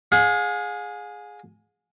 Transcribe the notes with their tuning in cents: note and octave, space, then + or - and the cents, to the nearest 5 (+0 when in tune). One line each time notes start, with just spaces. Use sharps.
G#4 +0 F5 +45